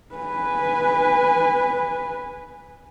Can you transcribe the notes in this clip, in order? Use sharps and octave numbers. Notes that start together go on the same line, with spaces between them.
B4 G#5